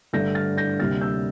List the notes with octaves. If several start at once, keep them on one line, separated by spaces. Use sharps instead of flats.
G2 D3 A3 D4 G6 A#6
F6 A6
G6 A#6
D2 C3 G3 A#3 F6 A6
E6 G6